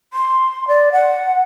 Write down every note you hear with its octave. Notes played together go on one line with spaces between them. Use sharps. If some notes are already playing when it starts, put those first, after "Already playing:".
C6
D5
F#5